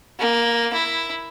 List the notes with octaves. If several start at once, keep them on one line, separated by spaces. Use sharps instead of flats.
A#3
E4